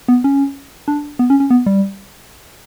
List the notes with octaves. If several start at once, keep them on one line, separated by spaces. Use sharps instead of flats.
B3
C#4
D4
B3
C#4
C#4
B3
G3